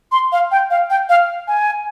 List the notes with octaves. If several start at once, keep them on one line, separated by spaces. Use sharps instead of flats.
C6
F5
G5
F5
G5
F5
G#5